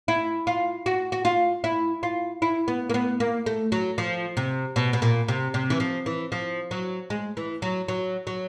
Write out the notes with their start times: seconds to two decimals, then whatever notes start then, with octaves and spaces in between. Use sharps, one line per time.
0.08 E4
0.47 F4
0.86 F#4
1.12 F#4
1.25 F4
1.64 E4
2.03 F4
2.42 E4
2.68 B3
2.89 A#3
2.94 B3
3.20 A#3
3.46 A3
3.72 F#3
3.98 F3
4.37 C3
4.76 B2
4.93 B2
5.02 A#2
5.28 C3
5.54 C3
5.70 E3
5.80 F3
6.06 E3
6.32 F3
6.71 F#3
7.10 G#3
7.37 E3
7.62 F#3
7.88 F#3
8.27 F#3